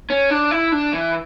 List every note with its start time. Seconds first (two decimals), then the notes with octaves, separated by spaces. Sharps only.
0.10 C#4
0.30 D4
0.51 E4
0.72 D4
0.93 E3